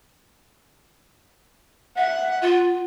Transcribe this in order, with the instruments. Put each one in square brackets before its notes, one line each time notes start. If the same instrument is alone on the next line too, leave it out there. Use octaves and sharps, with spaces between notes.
[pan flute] E5 [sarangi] F#5
[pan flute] F4